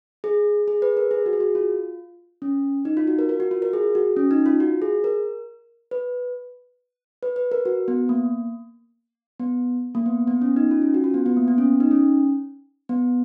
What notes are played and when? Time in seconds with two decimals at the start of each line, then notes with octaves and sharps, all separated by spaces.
0.24 G#4
0.68 G#4
0.82 B4
0.97 A#4
1.11 G#4
1.26 F#4
1.33 G#4
1.40 F#4
1.55 F4
2.42 C#4
2.85 D#4
2.97 F4
3.07 F#4
3.19 A#4
3.29 A#4
3.40 F#4
3.51 F4
3.62 A#4
3.73 G#4
3.95 F#4
4.17 C#4
4.31 D#4
4.46 F4
4.60 F#4
4.82 G#4
5.04 A#4
5.91 B4
7.23 B4
7.36 B4
7.51 A#4
7.65 F#4
7.88 B3
8.09 A#3
9.40 B3
9.95 A#3
10.06 B3
10.27 B3
10.42 C#4
10.56 D#4
10.71 F4
10.81 C#4
10.94 F#4
11.04 F4
11.14 B3
11.26 B3
11.37 A#3
11.48 B3
11.58 C#4
11.80 D#4
11.91 C#4
12.89 B3